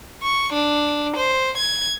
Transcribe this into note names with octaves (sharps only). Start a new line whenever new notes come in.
C#6
D4
C5
G#6